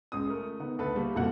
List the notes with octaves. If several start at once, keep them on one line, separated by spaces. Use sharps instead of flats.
C#2 C#3 D#6
A3 A#4
D#3 B3
D2 A4 B4
G3 A3 A#3
E1 C2 F2 A#3 F#4 F#5